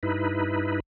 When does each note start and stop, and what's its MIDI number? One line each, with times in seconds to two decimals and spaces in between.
0.03 0.80 43
0.03 0.80 63
0.03 0.80 64
0.03 0.80 71